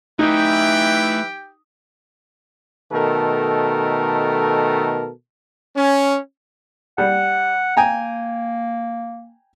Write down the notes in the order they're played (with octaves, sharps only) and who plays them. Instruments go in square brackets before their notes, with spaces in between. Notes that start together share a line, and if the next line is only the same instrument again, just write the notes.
[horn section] E3 E4 [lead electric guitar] A3 F5 [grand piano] D#4 [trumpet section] G4 G5
[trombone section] B2 D#3 A3 A4 A#4
[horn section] C#4
[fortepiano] G3 [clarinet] F#5
[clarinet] A#3 [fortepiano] G5 G#5 A#5